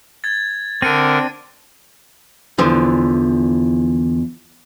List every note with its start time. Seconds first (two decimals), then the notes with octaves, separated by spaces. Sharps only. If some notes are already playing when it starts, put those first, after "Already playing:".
0.24 G#6 A6
0.82 D3 C4 D4 A#4 C#7 D#7
2.59 E2 D3 E3 F3